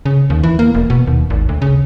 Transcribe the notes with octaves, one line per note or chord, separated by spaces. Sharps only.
C#3
D#2
E3
A#3
E1
B2
D#2
G#1
D2
C#3